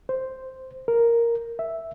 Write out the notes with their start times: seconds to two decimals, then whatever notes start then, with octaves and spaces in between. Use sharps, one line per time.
0.09 C5
0.88 A#4
1.59 E5